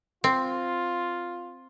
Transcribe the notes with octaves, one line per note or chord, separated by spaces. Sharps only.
C4 F4